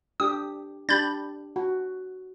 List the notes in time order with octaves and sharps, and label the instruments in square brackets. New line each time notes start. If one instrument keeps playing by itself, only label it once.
[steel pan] D4 G4 [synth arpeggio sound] D#6
[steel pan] D4 G4 [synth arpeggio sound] B5 G6 A6
[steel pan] F#4